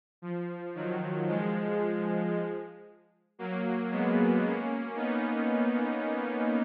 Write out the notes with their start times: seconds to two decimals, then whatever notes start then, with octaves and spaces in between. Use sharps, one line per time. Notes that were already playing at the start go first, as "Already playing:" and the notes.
0.22 F3
0.75 D#3 F#3
1.28 F3 G#3
3.39 F#3 A#3
3.91 G#3 B3
4.43 A#3 C#4
4.96 B3 D#4